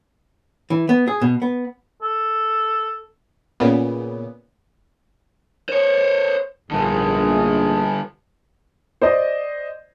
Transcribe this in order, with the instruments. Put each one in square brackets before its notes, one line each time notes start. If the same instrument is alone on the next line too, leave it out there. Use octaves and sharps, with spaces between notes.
[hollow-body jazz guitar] E3
B3
G#4
B2
B3
[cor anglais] A4
[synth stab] A#2 C#3 B3
[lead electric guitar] C5 C#5
[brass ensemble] A#1 G#2 G#4 [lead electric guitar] D3 G3
[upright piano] C5 D5 D#5